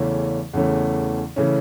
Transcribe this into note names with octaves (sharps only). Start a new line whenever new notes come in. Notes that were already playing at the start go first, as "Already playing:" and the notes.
Already playing: E2 C#3 E3 A3 C#4
E2 C#3 E3 A3 C#4
C#3 E3 A3 C#4